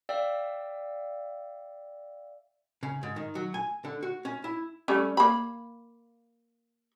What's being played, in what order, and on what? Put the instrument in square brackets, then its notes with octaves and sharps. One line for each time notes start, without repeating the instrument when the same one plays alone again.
[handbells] D5 E5 F5 G5 E6
[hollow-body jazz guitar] C#3
G#2
D#3
F#3
G#5
D3
F#4
C#4
E4
[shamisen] G3 A3 C#4
A#3 B5